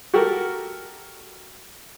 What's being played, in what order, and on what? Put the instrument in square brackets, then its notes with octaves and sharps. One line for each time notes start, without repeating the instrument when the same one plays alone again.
[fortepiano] F#4 G4 A4 A#4